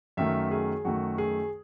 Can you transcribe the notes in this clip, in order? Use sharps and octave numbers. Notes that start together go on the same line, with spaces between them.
F#2 D#3 A3 E5
G#4
F#2 D#3 A3 F#4
G#4